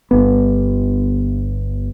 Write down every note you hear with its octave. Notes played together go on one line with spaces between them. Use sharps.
G1 B3